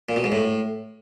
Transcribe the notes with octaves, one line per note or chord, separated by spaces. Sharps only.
A#2
B2
G#2
A2